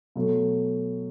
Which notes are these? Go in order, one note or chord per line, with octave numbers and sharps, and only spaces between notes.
B2 F#3 A3